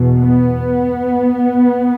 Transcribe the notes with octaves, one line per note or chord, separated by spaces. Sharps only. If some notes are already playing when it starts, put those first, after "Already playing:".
Already playing: E2 B2
B3